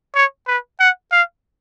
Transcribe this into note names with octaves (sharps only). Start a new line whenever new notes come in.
C#5
B4
F#5
F5